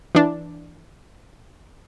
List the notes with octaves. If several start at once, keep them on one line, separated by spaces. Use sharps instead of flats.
E3 D4